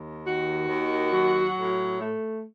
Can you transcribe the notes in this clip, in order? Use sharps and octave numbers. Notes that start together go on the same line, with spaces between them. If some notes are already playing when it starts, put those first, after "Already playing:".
Already playing: D#2
D#3 F#4
D#2
F#3
A2
A3